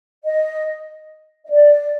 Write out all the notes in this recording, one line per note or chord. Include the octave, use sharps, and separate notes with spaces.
D#5
D#5
D5